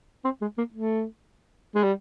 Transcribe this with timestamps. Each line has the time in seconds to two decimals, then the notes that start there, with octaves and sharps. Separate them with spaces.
0.24 C4
0.42 G#3
0.58 A#3
0.74 A3
1.75 G#3
1.83 G3